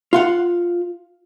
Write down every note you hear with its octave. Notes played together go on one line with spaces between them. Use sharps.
F4 F5 F#5